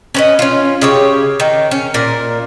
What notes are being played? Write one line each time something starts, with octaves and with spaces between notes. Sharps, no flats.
C#4 B4 D#5
C#4 F4
C#3 G4 C#5
D#3
C#4
A#2 A#4